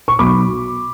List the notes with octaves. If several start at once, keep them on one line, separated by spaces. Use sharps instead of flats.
C#6
B1 B5 D6
B2